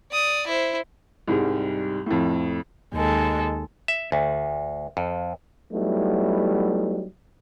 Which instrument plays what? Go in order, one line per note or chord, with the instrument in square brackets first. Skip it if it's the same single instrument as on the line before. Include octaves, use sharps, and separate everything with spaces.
[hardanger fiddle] D5 D#6
E4 C5
[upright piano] C2 G#2 G3 G#3
F2 A2
[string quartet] D#2 G#3 A4
[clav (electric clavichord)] E5
D2
F2
[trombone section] F#3 G3 A3 B3 D#4 E4